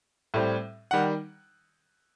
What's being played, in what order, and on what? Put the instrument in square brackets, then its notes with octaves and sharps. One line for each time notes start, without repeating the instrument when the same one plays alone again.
[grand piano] A2 G3 C4
D#3 G3 F#5